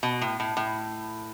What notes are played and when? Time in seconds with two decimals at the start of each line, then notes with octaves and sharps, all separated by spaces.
0.03 B2
0.21 A2
0.40 A2
0.57 A2